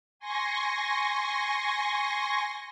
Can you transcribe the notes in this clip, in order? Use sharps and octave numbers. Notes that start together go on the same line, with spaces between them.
G#5 C6 C#6 A#6